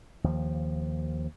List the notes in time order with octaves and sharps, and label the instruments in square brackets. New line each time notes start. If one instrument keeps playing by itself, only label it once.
[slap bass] D#2 F3